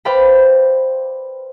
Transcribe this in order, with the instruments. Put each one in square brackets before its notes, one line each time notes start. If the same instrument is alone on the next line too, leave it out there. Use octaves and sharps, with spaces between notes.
[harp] B4 C5 D5 F5 G5 B5